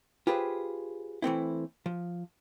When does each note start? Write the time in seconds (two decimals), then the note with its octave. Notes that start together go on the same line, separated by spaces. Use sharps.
0.27 F4 G4 G#4 B4 C5
1.22 E3 A3 C4 E4
1.86 F3